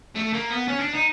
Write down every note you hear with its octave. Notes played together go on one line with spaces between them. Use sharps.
A3
A#3
B3
C#4
D4
D#4